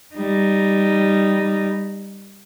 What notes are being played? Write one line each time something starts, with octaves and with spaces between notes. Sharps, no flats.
G3 D#4